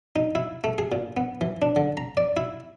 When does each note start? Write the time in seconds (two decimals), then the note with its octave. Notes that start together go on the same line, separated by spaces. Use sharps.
0.16 D#4
0.35 E4
0.64 A3
0.78 G#4
0.92 A#2
1.17 B3
1.41 E3
1.62 D4
1.76 D3
1.97 A#5
2.17 D5
2.37 E4